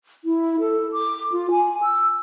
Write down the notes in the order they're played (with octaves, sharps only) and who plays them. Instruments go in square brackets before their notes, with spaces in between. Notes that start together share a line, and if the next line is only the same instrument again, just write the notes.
[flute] E4
A4
D6
F4
G#5
E6